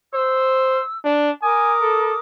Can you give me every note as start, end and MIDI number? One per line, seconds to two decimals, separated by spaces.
0.14 0.82 72
0.14 0.97 88
1.05 1.31 62
1.42 2.19 70
1.42 1.73 80
1.42 2.19 86
1.42 2.19 87
1.81 2.14 69